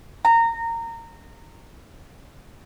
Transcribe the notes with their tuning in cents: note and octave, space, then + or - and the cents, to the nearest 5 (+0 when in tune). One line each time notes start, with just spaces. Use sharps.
A#5 -20